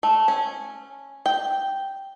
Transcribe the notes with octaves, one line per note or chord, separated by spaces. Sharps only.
A3
C#4
G5